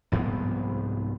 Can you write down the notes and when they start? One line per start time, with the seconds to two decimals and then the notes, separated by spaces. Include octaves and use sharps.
0.12 C2 G#2 F3 B3